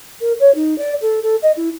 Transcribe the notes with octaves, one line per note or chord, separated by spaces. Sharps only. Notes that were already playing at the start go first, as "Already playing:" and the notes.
A#4
C#5
D#4
D5
A4
A4
D#5
E4